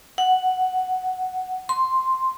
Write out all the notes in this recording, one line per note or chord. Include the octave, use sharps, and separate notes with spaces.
F#5
C6